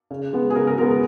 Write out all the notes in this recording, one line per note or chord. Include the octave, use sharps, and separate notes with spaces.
C#3
G#3 B3
G#4
C#3 A#4
A#4
G#3 B3 A#4
A#4